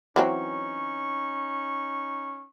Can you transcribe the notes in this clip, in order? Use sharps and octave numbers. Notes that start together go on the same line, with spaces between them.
E3 F#3 C4 C#4 D#4 C#6